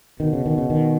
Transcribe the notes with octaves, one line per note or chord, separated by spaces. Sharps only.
B2 D#3
C#3
D#3
C#3
D#3